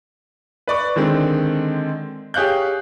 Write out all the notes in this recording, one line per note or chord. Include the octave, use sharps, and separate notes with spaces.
B4 D5 C#6
D3 D#3 G#3 C4
G4 G#4 C#5 F5 F#6 G6